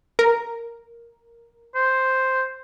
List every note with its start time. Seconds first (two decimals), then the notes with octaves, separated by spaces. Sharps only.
0.19 A#4
1.75 C5